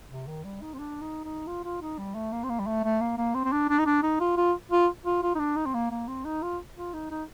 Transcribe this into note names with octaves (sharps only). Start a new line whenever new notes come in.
C3
D#3
G3
D#4
C4
D4
D#4
D#4
F4
F4
D#4
G3
A3
A#3
C4
A#3
G3
A3
A3
A#3
A#3
C4
C4
D4
D4
D#4
D4
D#4
F4
F4
F4
F4
F4
D#4
D4
D#4
C4
A#3
A#3
C4
D#4
F4
F4
D#4
D#4